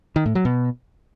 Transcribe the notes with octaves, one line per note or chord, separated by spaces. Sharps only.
D#3
A2
F#3
B2